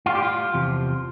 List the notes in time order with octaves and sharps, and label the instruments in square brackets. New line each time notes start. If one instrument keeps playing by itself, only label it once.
[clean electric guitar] A2 G3 F4
G4
F4
E2 C3 F3